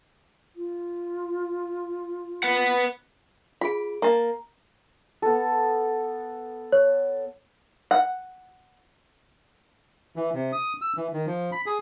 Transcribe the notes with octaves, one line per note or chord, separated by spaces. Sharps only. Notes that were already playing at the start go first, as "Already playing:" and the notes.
F4
B4 F#5
F4 G#4 B5 D7
A#3 A5 A#5
B3 A4
C#5
F#5
E3
C3
D#6
E6
E3
D#3
F3
B5
G#4